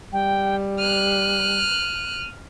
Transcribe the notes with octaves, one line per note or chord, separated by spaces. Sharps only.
G3 G5
F6 F#6 D#7